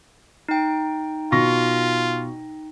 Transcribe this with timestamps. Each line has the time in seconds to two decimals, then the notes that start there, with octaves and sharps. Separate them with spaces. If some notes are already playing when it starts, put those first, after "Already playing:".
0.49 D#4 G5
1.32 B2 F4 C#6 A#6